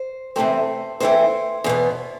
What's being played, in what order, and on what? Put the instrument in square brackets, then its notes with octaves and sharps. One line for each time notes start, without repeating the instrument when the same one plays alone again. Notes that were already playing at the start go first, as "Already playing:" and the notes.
Already playing: [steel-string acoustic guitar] C5
E2 C3 E3 A3 C4 C5
E2 C3 E3 A3 C4 C5
E2 B2 B3